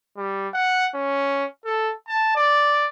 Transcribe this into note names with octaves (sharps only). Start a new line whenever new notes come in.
G3
F#5
C#4
A4
A5
D5